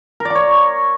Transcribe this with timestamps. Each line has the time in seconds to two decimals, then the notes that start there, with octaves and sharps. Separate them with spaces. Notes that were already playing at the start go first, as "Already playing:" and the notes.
0.20 A#4
0.25 D5
0.30 C#6
0.35 C#5